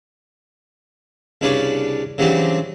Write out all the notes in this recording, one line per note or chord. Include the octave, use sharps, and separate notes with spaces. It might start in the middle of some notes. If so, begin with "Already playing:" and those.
C2 C#3 D4 B4 C#5 D5
C#3 E3 F#3 G3 C4 D4